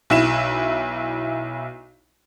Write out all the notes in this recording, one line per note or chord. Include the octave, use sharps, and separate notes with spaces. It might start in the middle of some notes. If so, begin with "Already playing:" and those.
B1 E4 E7